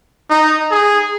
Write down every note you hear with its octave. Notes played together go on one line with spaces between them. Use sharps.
D#4
G#4